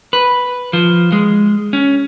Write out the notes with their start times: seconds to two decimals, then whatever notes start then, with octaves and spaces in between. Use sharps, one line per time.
0.13 B4
0.73 F3
1.12 G#3
1.73 C#4